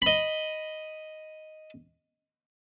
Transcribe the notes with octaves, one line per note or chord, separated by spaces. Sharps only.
D#5 B5